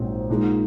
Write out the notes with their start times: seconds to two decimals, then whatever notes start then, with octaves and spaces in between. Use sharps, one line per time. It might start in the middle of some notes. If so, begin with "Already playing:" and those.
Already playing: A#1 G#2 F#3 C4 D#4
0.30 A#2 G#3 D#4